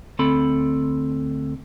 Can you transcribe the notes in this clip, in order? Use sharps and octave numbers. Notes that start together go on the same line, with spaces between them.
D2 C4 A4 B5